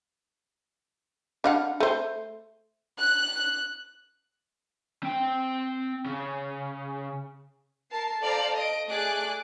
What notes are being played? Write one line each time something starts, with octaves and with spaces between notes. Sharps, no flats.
D4 F5 F#5
A3 C5
F#6
C4 G5
C#3
A#4 A5 C7
A4 C5 D5 F5 A5 A#5
D#5 D7
A3 G#4 D5 D6 F#6